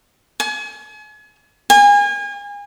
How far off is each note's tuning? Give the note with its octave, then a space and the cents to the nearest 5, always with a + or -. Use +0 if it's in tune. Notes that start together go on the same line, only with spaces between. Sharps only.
G#5 +40
G#5 -35